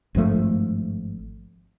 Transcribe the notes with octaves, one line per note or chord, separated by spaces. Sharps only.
G#1 G2 F3 A3